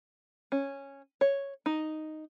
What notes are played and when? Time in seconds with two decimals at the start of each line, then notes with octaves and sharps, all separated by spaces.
0.52 C#4
1.21 C#5
1.66 D#4